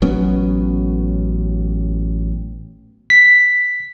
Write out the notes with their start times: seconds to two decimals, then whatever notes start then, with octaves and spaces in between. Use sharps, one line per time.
0.02 A1 F#3 B3 C#4
3.10 B6